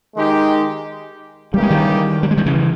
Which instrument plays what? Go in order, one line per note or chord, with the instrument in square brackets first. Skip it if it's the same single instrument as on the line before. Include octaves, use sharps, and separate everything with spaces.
[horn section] D#3 G#3 D#4 G4
[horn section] C#3 E3 A#3 D#4 G4 [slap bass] G3
[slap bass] G#3
D#3 G3
G3
G#3
D#3 G3
C#3 E3